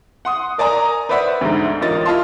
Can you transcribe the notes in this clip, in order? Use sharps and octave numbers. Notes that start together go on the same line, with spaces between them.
F#5 C6 D#6
A#4 D5 G#5 A#5 D#6
B4 C5 D5 E5 F#5 B5
D2 G#2
A1 F4 A#4 D#5 A6
E4 F4 D#5 F5 A5 C6